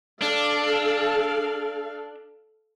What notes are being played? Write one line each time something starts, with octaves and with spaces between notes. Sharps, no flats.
D4 A4 F5